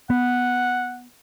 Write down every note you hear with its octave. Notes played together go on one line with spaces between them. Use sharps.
B3 F#5